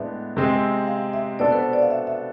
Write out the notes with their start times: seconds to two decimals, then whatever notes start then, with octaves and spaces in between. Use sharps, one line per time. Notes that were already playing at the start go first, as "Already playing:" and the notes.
Already playing: A2 G#3 B3 D4 E5
0.37 C3 G#3 C4 G#4
0.88 F5
1.13 E5
1.39 B2 B3 D4 A4 D5
1.52 B4
1.56 C5
1.73 D5
1.82 F5
1.90 E5
2.07 E5